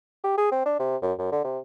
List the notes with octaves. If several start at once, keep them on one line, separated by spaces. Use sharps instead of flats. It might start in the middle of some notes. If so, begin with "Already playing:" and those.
G4
G#4
C4
D4
C3
F#2
F#2
D3
C3